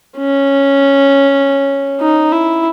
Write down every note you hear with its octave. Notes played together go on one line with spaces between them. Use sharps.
C#4
D#4
E4